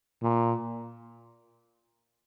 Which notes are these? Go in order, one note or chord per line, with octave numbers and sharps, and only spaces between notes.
A#2